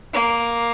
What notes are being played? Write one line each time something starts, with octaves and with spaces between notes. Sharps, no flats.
A#3